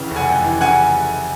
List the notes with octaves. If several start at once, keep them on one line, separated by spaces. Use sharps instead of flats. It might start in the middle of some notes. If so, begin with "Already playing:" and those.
Already playing: F1 F2 C#3 E3
F1
F#5 G#5
F2
E3
C#3 F#5 G#5